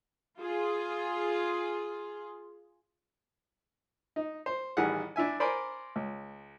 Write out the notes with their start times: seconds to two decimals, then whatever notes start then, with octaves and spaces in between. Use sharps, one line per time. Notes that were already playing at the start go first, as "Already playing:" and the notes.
0.40 F4 G#4
4.16 D#4
4.46 C5
4.77 A1 D#3 E3 G3 G#4 F#5
5.16 D4 E4 E5 G#5
5.40 A#4 C5 D5 G#5 B5
5.96 C#2